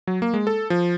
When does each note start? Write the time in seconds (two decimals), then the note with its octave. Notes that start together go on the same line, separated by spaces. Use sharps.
0.07 F#3
0.22 A#3
0.34 G#3
0.47 A4
0.70 F3